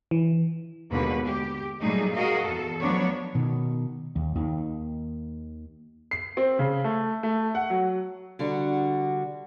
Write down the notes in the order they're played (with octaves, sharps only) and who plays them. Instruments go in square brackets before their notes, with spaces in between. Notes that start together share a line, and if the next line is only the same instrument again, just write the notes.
[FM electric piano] E3
[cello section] D#2 B2 D3 G#3 B4
G4
A#2 F#3 G3 A3 D#4 G#4
F#4 G#4 A#4 D#5 F5
E2 A4
F3 F#3 A3 B3 D4 C#5
[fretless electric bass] B2 D#3
D#2
D#2 D#3
[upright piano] C7
C4
C#3
A3
A3
F#5
F#3
[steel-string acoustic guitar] D3 G3 D4 F#4